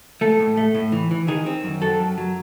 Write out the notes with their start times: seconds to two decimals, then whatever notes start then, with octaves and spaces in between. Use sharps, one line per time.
0.21 A3 A4
0.39 A2
0.57 A3
0.74 A2
0.92 E3
1.11 E3
1.28 D#3 G#4
1.46 C4
1.64 F#2
1.82 F#3 A4
2.00 F#2
2.18 F#3